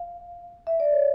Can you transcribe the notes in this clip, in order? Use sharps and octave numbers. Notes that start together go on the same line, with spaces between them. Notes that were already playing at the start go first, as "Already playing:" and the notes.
Already playing: F5
E5
D5
C#5